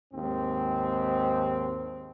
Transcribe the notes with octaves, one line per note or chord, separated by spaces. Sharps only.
D#2 G#2 C4